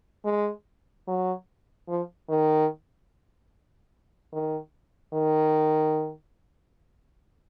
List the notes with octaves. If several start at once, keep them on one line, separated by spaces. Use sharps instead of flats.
G#3
F#3
F3
D#3
D#3
D#3